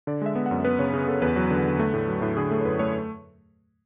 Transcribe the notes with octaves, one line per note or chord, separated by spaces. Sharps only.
D3 D5
G#3 E5
B3
F#2 F#5
B3 B4
C#3 C#5
C#3 G#4
B3 A4
E2 B4
F#3
D3
D3
A3
A2
F#3
A2
D3 G#4
A3
C#5
F#2 B4
A3 C#5